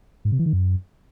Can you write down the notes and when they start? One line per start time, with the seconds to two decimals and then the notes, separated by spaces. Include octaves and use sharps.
0.25 G#2
0.32 C3
0.39 E3
0.46 D#3
0.53 F#2